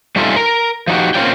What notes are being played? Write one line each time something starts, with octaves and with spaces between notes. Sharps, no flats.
G3 A3 C#4 D#4 F4 A4
A#4
F3 F#3 D#4 F#4 G4
A#3 C4 C#4 F4 D5 G5